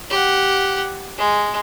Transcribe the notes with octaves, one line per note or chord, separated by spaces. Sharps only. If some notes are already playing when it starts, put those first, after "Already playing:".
G4 F#5
G#3